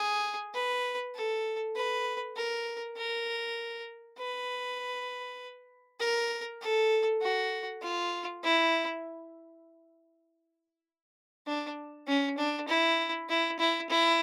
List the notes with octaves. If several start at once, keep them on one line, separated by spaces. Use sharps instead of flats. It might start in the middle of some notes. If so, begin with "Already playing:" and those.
Already playing: G#4
B4
A4
B4
A#4
A#4
B4
A#4
A4
F#4
F4
E4
D4
C#4
D4
E4
E4
E4
E4